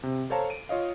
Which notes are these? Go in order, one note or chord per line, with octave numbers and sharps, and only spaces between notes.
C3
A4 C5 C#5 F5 A5 A#5
D7 D#7
F4 C#5 D#5 F5